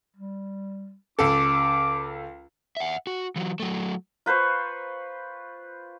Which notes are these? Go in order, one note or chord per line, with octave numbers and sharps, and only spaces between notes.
G3
C#2 A4 D6
E5 F#5
F#4
E3 F#3
F#3 A3
F4 B4 C5 C#6